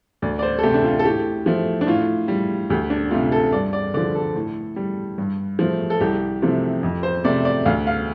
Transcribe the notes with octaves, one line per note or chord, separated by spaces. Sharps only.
D2 D5
D5
C5
A4
C3 A3 G4
D4
F4
A4
A2 G4
F3 A3
D4
A2 F4
G3
D2 G4
D4
C3 A3 F4
A4
G2 D5
D5
D3 F3 D5
A4
A2
G3
G2
F3 A3
A4
C2 G4
C3 F3 A3
F2
C5
C3 A3 D5
D5
D2 F5
F5